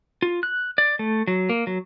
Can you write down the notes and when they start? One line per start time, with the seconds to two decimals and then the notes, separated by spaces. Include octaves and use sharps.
0.22 F4
0.43 F#6
0.78 D5
0.99 A3
1.28 F#3
1.49 A#3
1.67 F#3